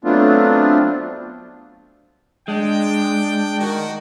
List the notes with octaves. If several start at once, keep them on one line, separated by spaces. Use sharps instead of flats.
F#3 A3 B3 C4 D4 F4
G#3 D4 G5
D#3 F#4